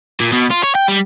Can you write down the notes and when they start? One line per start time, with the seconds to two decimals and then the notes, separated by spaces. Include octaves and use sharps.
0.20 A#2
0.32 B2
0.50 F4
0.63 C#5
0.75 G5
0.89 G3